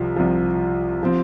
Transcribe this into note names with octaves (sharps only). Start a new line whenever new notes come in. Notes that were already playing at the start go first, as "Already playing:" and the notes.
Already playing: C2 C3 F3
C2 C3 F3
F3 C4